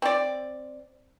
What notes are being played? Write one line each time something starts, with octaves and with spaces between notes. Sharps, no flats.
C4 D5